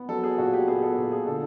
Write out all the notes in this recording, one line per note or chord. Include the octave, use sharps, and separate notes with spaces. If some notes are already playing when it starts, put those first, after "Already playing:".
Already playing: B3
F#3 A4
G#4
A#2 F#4
G4
B3 G#4
A4
A#2
G#4
D3 A4